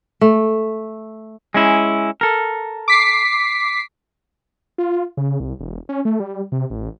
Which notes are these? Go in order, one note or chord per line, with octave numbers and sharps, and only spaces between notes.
A3
G#3 C#4 E4
A4 A#4
D6 B6 C7
F4
C#3
C2
E1
C#4
A3
G3
C3
A1